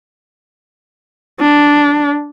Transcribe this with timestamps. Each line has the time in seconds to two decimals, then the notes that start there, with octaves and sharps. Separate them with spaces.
1.40 D4